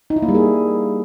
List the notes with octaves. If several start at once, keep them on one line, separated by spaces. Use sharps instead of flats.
D#4
E4
A#3
G3
G#4